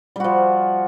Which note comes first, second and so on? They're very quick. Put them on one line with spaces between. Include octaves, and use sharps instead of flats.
G3 F#4 F3